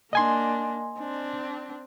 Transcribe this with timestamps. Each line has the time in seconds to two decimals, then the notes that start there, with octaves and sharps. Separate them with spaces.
0.13 A#3 D4 D#5 G#5 C6
0.99 C4 D4